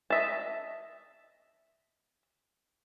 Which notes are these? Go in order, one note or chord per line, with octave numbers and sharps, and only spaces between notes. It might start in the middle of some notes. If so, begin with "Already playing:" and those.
D#5 E5 A5